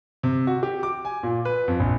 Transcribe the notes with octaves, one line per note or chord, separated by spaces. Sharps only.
C3
F#4
G4
D6
G#5
A#2
B4
F2
A#1